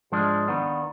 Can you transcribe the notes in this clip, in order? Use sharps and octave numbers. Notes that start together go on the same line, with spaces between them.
G#2 F3 G#3 D4
D#2 D#3 B3 D4